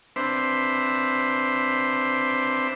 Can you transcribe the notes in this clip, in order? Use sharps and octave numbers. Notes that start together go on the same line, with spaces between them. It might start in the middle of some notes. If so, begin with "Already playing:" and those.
C4 D4 B4 C5 E5